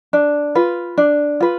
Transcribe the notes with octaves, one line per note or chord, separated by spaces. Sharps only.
D4
F4 B4
D4
F4 B4